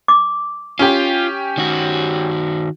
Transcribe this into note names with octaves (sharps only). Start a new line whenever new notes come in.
D6
C#4 F4 G4
D#3 F#4